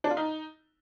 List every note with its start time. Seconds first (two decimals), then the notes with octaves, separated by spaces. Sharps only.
0.04 D4
0.11 F4
0.17 D#4